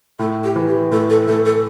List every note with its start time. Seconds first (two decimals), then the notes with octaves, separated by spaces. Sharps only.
0.19 A2 A4
0.43 G4
0.56 E3
0.67 G4
0.91 A2 A4
1.09 A4
1.27 A2 A4
1.45 A4